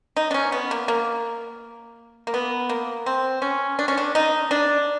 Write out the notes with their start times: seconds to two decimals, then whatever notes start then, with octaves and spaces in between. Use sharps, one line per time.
0.17 D#4
0.31 D4
0.34 C#4
0.52 B3
0.71 A#3
0.88 A#3
2.27 A#3
2.34 B3
2.69 A#3
3.06 C4
3.42 C#4
3.79 D4
3.88 C#4
3.97 D4
4.15 D#4
4.51 D4